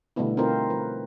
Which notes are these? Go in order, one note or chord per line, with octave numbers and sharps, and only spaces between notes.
B2 D3 G3 A3 B3 E4
C4 D#4 F4 A#4 C5
F3 B4